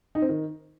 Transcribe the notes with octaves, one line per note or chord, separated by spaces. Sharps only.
D#4
C4
D#3